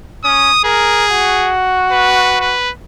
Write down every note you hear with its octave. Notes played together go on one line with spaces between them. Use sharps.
C#4 D#6
G#4 A#4
F#4
B4
B4